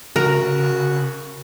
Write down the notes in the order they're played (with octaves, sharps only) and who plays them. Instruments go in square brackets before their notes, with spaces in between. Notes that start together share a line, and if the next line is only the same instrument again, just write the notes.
[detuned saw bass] C#3 [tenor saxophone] F#4 [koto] A#4